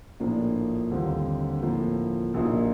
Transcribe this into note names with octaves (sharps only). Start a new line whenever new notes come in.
A#1 A2 F3 A#3 D4
D#2 D3 G3 C4
A2 F3 A#3
A#1 A#2 F#3 A#3 D#4